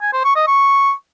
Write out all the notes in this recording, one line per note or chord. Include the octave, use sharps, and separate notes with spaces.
G#5
C5
C#6
D#5
C#6